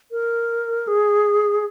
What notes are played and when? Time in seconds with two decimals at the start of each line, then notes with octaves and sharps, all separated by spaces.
0.11 A#4
0.87 G#4